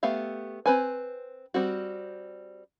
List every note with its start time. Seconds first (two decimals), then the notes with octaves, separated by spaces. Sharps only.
0.03 A3 B3 G4 E5 F5
0.66 C4 B4 G#5
1.54 G3 C4 F#4